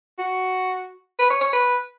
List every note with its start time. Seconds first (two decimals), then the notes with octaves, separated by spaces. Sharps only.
0.19 F#4
1.19 B4
1.30 C#5
1.41 C#5
1.53 B4